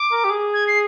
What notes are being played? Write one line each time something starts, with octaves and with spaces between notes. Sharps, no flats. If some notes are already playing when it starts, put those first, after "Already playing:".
Already playing: D6
A#4
G4
G#4
G#6
C7